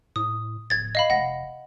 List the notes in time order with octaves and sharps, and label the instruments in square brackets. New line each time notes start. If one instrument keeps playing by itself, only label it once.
[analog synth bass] A2 [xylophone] D#6
[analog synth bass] D1 [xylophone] G#6 A6
[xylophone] D#5 F5 B5
[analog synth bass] F1 [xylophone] F#5 A#6